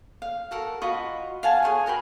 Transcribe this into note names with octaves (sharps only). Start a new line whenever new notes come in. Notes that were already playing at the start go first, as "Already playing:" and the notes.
F5
F#4 A4 A#4
F4 F#4 D#5 B5
F5 F#5 G#5 A5
G#4 C5 C#5 G#5
F#4 A#4 G5 B5